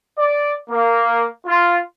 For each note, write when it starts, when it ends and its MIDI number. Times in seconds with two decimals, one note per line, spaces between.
0.18 0.53 74
0.70 1.26 58
1.46 1.78 65